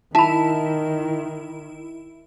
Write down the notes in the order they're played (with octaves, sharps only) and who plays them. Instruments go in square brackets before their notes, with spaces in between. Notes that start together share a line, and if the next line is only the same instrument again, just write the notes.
[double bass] D#3 [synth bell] E4 [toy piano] A5 B5